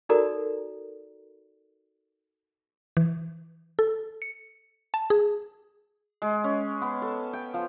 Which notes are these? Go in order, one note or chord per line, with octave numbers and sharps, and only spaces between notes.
D#4 F#4 A4 A#4 D5 A#5
E3
A4
C#7
A5
G#4
G#3
C#4
B3
A4
G5
F3